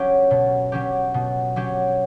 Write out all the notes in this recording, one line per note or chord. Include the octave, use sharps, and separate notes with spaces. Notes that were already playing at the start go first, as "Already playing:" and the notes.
Already playing: F#3 C#4 G4
B2
F#3 C#4 G4
B2
F#3 C#4 G4